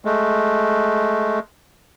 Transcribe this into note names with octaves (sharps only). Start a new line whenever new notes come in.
G#3 A3